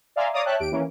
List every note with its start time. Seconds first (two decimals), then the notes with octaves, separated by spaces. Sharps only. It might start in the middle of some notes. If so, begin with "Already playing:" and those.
0.16 D5 E5 F5 G#5 A#5 C6
0.34 C#5 D5 F5 A#5 D6 D#6
0.45 C#5 E5 G5 A5 F#6
0.60 D#2 G4 D7
0.71 E3 A#3 C#4